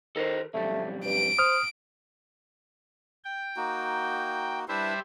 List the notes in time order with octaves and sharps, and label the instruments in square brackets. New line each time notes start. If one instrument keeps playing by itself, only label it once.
[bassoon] D#3 [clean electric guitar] A4 A#4 C5
[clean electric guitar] B1 F2 G3 [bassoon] A3
[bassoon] G2 [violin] D7
[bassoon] C5 [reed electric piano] D#6 F6
[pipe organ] G5
[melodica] A#3 D#4 F#4
[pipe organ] G3 C5 E5 [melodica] D4 E4 B4